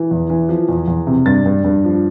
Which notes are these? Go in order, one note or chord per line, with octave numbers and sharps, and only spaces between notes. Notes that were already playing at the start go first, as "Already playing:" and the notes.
Already playing: E3
E2
E3
F3
E2
E2
C3
G2 A6
G2
G2
F3